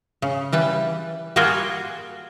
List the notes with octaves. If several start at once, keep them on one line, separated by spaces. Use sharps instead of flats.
C#3
E3 G3 B4
G3 A#3 F4 F#4 G#4 G5